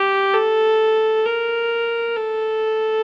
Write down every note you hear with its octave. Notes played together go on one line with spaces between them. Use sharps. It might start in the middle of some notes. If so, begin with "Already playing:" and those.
Already playing: G4
A4
A#4
A4